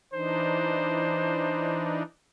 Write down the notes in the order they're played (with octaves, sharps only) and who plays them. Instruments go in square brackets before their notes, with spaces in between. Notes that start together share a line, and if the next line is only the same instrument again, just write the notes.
[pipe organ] E3 D4 D#4 [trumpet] C5